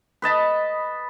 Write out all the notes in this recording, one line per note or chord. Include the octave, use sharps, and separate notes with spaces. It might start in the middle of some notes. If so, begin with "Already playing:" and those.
B4 D#5 A5 B5